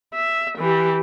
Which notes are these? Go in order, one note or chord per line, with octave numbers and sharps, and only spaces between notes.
E5
E3 G4